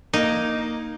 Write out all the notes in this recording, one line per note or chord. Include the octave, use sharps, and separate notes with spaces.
A#3 D#4